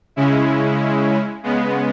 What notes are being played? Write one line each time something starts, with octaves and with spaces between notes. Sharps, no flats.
C#3 G#3 C#4 E4
C#3 G#3 B3